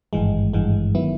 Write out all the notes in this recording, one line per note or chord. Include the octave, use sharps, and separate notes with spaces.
G#1 G2 E3 G#3
G#1 G2 E3 G#3
D#3 F#3 B3 E4